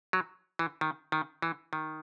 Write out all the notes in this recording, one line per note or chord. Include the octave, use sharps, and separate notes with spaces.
F#3
E3
D#3
D#3
E3
D#3